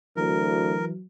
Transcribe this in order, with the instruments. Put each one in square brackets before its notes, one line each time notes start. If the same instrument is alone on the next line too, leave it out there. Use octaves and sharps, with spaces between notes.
[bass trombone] D2 [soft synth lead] E3 [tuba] F#3 [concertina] A#4